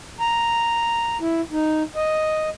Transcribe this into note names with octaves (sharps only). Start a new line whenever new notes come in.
A#5
E4
D#4
D#5